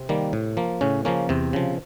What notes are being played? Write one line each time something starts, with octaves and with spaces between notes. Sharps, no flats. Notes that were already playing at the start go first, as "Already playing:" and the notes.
Already playing: C3 C4
D#3 G3 A#3
A2
F3 A#3
A2 C#3 C#4
C#3 F3 A#3 C#4
E2 C3 C4
C#3 F3